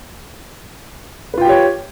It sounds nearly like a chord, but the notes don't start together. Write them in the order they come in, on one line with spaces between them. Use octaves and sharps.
B4 F4 G5 G4 C#5